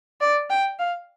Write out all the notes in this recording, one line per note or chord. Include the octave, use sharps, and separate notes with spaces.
D5
G5
F5